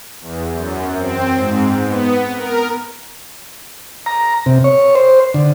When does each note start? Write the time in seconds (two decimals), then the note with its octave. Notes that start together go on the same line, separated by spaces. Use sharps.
0.21 E2
0.52 F#2
0.98 C4
1.35 G#2
1.83 B3
2.34 A#4
4.06 A#5
4.46 C3
4.64 C#5
4.95 C5
5.34 D3